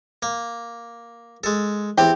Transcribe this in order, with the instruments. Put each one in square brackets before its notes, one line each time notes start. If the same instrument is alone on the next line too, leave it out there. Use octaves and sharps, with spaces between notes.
[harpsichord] A#3
G#3 A4
[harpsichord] E2 C4 [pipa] G4